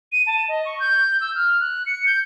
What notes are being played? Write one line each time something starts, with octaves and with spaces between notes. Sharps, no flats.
D#7
A5
D#5
C#6
G6
E6
F6
F#6
C#7
G6